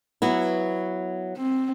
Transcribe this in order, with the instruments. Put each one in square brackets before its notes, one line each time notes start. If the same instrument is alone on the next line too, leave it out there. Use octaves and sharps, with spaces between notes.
[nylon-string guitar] F#3 B3 E4
[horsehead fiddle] C4